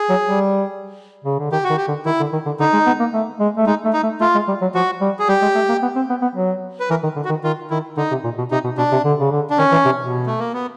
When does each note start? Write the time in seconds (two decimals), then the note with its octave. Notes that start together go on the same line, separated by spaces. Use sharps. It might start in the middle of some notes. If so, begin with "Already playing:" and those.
Already playing: G#4
0.09 F#3
0.26 G3
1.24 C#3
1.39 D3
1.51 D#3 G4
1.64 F#4
1.70 D#3
1.77 G4
1.88 D3
2.05 D#3 E4
2.20 D3
2.33 D#3
2.46 D3
2.59 D3 D#4
2.73 G#3
2.86 B3
2.99 A#3
3.13 A3
3.40 G#3
3.57 A3
3.67 G#3 D#4
3.85 A3
3.93 D#4
4.03 A3
4.20 A3 F4
4.35 G#3
4.48 G3
4.61 F#3
4.74 F3 F#4
5.01 G3
5.19 G#4
5.28 G3 G4
5.42 G#3
5.55 A3
5.68 A#3
5.82 B3
5.96 C4
6.10 B3
6.22 B3
6.36 F#3
6.80 B4
6.90 E3 A#4
7.03 D#3
7.16 D3
7.25 F#4
7.29 D#3
7.43 D#3 F4
7.70 D#3 E4
7.97 D3 D#4
8.11 C3
8.24 A#2
8.38 B2
8.51 C3 D#4
8.64 B2
8.77 B2 D4
8.92 C3
9.05 D3
9.20 C#3
9.32 D3
9.50 D4
9.58 D#3 C#4
9.71 E3
9.85 C3
9.98 B2
10.27 A3
10.39 A#3
10.53 B3